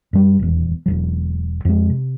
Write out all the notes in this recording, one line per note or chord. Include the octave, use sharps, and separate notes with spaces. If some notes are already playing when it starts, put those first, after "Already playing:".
F#2 G3
D#1 E2
E1 D#2 F#3
F2 G#3
C3